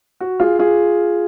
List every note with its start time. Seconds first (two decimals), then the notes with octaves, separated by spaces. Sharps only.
0.20 F#4
0.40 F4 G#4
0.59 F4 G#4